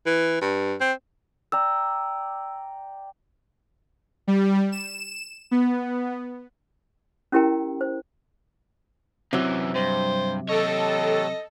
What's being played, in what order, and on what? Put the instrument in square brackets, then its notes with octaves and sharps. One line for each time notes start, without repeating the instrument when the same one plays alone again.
[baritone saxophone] E3
G2
C4
[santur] D5 G5 A#5 [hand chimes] E6
[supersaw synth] G3
E7
B3
[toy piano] C#4 E4 G4 A#4 G5 A#5
C5
[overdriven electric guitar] F#2 E3 [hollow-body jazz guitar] C3 F#3
[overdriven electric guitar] G2 [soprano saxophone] C5
[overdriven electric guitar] G4 C#5 [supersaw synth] A4 [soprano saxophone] D#5